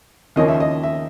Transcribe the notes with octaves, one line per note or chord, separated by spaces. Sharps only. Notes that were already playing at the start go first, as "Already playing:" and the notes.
D#2 C#3 F3 A#3 C#4 D#5
E5
D#5
E5